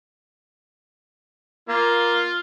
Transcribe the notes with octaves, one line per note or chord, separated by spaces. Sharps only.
A#3 F4